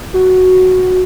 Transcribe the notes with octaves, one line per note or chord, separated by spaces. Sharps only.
F#4